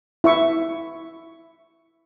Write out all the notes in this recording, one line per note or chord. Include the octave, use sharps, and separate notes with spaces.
E4 E5 C#6